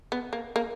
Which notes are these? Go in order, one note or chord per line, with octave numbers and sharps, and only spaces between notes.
B3
A#3
A#3